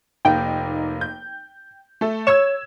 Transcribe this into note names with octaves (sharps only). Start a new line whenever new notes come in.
F1 A#3 D#4 G5
G6
A3 A4
C#5 E6 G#6 E7